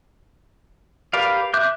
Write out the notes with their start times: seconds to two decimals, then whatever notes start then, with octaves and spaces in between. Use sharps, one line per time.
1.13 G4 A#4 B4 D5 F5
1.54 E5 D6 F#6 G6